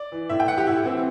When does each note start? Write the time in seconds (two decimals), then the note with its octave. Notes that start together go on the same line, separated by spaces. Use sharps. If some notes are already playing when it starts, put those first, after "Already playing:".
Already playing: D5
0.12 E3
0.29 A2 E5
0.40 G5
0.48 E3 F#5
0.58 G4
0.67 A2 E4
0.86 E3 C4